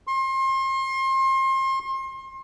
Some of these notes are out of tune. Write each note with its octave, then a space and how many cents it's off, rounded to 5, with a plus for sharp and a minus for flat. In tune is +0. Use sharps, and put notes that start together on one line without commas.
C6 +35